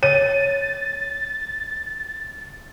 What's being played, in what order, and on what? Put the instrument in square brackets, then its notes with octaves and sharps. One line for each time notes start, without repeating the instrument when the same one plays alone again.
[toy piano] C#5 [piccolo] A6 [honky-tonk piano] D#7